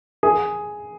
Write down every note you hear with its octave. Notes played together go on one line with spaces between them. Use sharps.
G#4